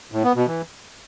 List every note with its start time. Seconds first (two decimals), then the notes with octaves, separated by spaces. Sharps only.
0.12 A2
0.24 B3
0.35 B2
0.47 E3